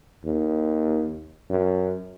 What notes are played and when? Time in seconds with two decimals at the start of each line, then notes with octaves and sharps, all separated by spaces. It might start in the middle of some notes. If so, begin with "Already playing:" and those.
0.24 D#2
1.50 F#2